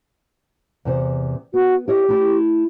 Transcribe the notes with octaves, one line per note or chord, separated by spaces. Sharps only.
E2 C3 C5
B3 F#4
E4 G4 C#5 D#5
A3 E4